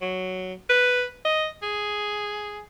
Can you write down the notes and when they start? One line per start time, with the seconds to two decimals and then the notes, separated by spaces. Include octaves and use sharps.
0.02 F#3
0.69 B4
1.25 D#5
1.63 G#4